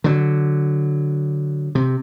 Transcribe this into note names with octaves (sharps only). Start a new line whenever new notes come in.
D3 F#3
C3